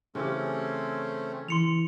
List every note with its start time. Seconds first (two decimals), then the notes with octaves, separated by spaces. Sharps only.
0.15 C#3 E3 A3 C4 C#4 G4
1.48 E3 C6 C#7 F7